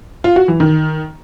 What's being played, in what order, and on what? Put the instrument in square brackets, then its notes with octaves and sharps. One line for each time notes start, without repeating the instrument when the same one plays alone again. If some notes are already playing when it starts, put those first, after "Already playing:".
[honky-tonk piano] F4
F#4
E3
D#3